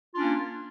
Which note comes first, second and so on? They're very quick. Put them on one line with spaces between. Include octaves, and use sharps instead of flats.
F4 D4 C#4 A#3